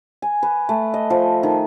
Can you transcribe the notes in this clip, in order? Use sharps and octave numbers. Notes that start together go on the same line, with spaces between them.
G#5
B4
A3
D#5
F3
D#3